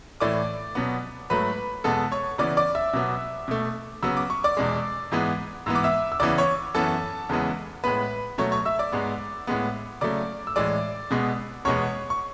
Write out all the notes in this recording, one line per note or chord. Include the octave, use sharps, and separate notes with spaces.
A2 E3 A3 D5 D6
B2 F#3 B3
G#2 F#3 A3 B4 B5
E2 B2 G#3 B3 A4 A5
C#5 C#6
C#3 E3 B3 D5 D6
D5 D6
E5 E6
B2 F#3 B3
B2 A3
C#3 F#3 B3 E6
D6
C#6
D5 D6
E2 B2 G#3
G#2 E3 G#3 B3
G#2 E3 B3 E6
D6
E5 E6
E6
E2 C#3 E3 B3 D5 D6
C#5 C#6
F#2 E3 B3 A4 A5
E2 C#3 E3 G#3 B3
A2 G#3 B3 B4 B5
B2 F#3 A3 C#5 C#6
C#5 C#6
E5 E6
D5 D6
G#2 G#3 B3
A2 G#3 B3
C#3 F#3 A3 D5 D6
E6
A2 E3 G#3 D5 D6
B2 G#3 B3
E2 B2 G#3 B3 C#5 C#6
C#6